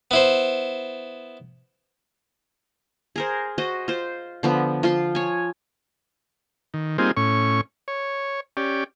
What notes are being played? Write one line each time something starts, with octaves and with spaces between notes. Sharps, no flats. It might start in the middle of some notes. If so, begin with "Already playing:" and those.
B3 E4 C5
G#4 A#4 C5
F#4 C5 D#5
F4 C5
D3 F3 B3
F3 F4 C6
C#5 G#5
D#3
G3 A#3 C4 D#4 F4 G#4
A2 C#4 C#6
C#5
C#4 G4 D5